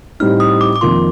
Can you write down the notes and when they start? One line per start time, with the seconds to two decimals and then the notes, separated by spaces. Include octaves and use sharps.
0.20 A2 G3 C4 D#4 F6
0.40 D#6
0.61 D6
0.76 D6
0.81 F2 D#3 A#3 F4 C6